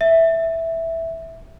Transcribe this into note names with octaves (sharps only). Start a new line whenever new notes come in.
E5